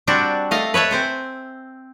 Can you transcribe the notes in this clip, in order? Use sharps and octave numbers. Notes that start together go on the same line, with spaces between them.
G3 C4 D4 F#4
A3 D#5 F5
B4 C#5 E5 A5
C4 C5 G#5